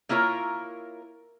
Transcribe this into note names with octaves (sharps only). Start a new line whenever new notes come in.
A#3 E4 F4 A#4 C#5